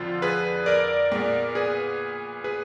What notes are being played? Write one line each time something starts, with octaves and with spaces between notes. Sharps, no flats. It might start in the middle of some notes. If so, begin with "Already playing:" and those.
Already playing: F2 D3 F3 F4
G#4 B4
A#4 D5
A#2 G#3 B3
G#4 B4
G#4 B4